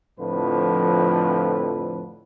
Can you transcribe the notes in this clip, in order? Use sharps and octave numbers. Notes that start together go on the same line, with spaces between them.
F2 A2 D3 F3 B4